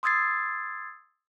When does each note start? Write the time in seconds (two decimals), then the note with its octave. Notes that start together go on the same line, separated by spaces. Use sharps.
0.03 C6 D#6 E6 G#6 A6 C7